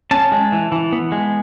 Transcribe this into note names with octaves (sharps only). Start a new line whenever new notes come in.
C#4 A5
G#3
E3
E3
B3
G#3